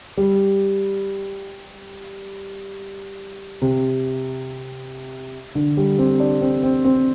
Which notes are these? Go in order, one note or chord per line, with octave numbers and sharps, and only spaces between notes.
G3
C3
D3
G3
C4
D4
C4
C4
C4